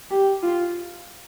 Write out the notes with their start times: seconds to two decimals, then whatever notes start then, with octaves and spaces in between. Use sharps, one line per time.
0.11 G4
0.43 F4